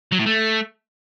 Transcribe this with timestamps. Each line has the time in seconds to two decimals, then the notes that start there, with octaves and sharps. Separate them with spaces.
0.12 F#3
0.19 A2
0.26 A3